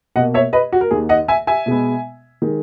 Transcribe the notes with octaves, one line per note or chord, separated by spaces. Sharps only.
B2 A#3 D#5 F#5
C#5 E5
B4 D#5
F#4
A#4
D#2 D#3 A#3 G#4
D#5 F#5
E5 G#5
E5 G#5
B2 G#3 B3
D#3 G#3